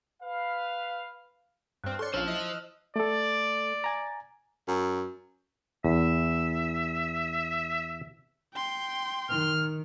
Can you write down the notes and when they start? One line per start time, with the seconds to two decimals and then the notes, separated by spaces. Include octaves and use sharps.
0.23 B4 F5
1.84 G2 C4 F6 F#6
1.99 A4 C#5 D5 C6 C#6
2.14 A#1 C#4 F4 C5 A5 E6 F6 E7
2.28 E4 D#5
2.40 F7
2.96 A3 A4 D5
3.84 G#5 A#5
4.68 F#2
5.84 E2 E5
8.53 G5 C6
9.30 D#3 F6